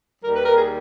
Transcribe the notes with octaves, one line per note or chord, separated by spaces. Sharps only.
D#2 D#3 G3 A#4
B4
A#4
G#4